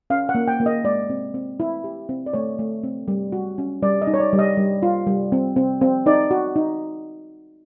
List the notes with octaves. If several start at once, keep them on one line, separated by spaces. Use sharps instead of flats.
C#4 F5
F#5
A#3
G5
A#3
D#5
G#3 D5
C4
C4
E4
G4
C4
D5
A3 C#5
A3
C4
G3
F#4
C#4
G3 D5
D#5
D#4
C#5
D5
G3
D#5
G3
F4
G3
C4
C4
C4
D#4 D5
F#4
D#4